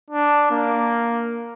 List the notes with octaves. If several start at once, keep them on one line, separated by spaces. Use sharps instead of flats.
D4
A#3